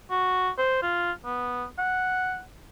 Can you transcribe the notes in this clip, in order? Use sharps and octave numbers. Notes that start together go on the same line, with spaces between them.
F#4
C5
F4
B3
F#5